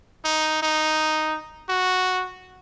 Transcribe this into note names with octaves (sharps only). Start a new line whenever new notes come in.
D#4
D#4
F#4